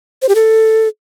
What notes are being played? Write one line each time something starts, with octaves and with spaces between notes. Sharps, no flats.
C5
G4
A4